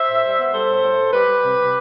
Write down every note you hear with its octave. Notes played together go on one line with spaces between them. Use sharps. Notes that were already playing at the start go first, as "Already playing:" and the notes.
Already playing: C5 E5
A2
G3
B3
G3 A4 C5
A2
A2
A2
G3 G4 B4
G3
C3
C3